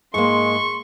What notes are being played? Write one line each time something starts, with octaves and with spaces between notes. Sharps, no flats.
G#2 G#3 A#3 C6 C#6